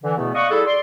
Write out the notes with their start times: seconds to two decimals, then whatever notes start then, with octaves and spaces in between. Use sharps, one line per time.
0.03 D3 E3
0.17 E2 B2 A3 B3
0.35 D5 D#5 F5 F#5 C#6
0.50 G3 E4 G#4 A4
0.67 D5 C6